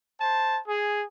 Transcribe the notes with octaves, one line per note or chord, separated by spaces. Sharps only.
C5 A5
G#4